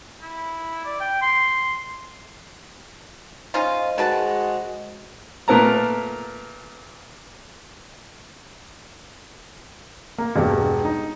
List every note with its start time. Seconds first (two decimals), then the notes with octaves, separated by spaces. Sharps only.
0.22 E4
0.85 D5
1.00 G5
1.22 C6
3.54 C#4 D#4 F4 C5 D#5
3.98 D#3 G#3 F#4 B4 A5
5.48 A#2 A3 B3 A#4 A5 A#5
10.18 A#3
10.36 E1 G2 G4
10.85 D#4